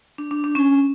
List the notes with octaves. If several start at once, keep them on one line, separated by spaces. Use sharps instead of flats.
D4
D4
D4
C#4